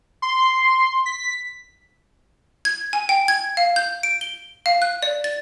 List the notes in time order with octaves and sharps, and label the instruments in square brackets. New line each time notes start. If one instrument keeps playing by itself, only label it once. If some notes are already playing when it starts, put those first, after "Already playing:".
[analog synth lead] C6
B6
[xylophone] G#6
G#5
G5
G#6
F5
G6
D7
G7
F5
F#6
D5
A6